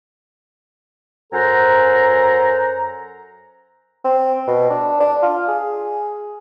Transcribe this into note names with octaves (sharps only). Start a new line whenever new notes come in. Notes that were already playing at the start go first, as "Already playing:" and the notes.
F#2 A4 C5 F#5 G#5 A#5
C4
B2
D4
D4
F4
G#4